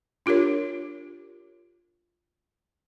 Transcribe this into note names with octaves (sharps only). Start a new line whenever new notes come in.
D4 F4 G4 A#4 C#5